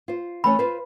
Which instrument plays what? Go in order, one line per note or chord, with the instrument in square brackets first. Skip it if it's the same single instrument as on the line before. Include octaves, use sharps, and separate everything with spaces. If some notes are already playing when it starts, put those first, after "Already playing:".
[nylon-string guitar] F4 C5
[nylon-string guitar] E3 A3 C#4 [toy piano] B5
[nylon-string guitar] F4 B4 C5